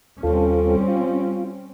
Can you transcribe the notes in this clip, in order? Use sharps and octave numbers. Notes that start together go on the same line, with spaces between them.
D#2 G3 C4 C#4 F4 A4
F4